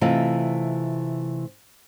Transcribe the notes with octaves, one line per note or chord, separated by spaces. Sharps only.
C3 E3 A3 F4 D#5